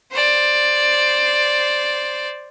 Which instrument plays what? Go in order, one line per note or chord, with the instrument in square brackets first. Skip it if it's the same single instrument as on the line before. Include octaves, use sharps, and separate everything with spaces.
[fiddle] C5 D5